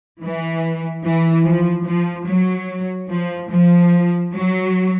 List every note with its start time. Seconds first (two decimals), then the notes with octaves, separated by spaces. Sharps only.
0.21 E3
1.04 E3
1.45 F3
1.87 F3
2.28 F#3
3.11 F3
3.52 F3
4.34 F#3